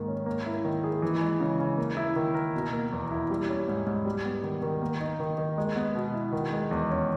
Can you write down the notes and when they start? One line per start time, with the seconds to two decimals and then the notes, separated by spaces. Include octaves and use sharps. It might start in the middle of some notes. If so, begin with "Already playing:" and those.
Already playing: G#2 D#3 A#3
0.08 C#4
0.26 A#3
0.46 E4
0.65 D#3
0.84 G#4
1.02 E3
1.21 G#3
1.40 C#3
1.59 C#3
1.78 A#3
1.97 E4
2.16 D#3
2.35 A#4
2.55 B2
2.73 A#3
2.92 E2
3.11 E4
3.30 G3
3.49 C#4
3.68 G#2
3.86 G#2
4.05 G3
4.24 B3
4.43 D#3
4.63 D#3
4.82 A#3
5.00 D#4
5.20 D#3
5.38 D#3
5.58 G#3
5.76 B3
5.95 B2
6.14 E4
6.33 D#3
6.53 G#3
6.71 E2
6.90 C#4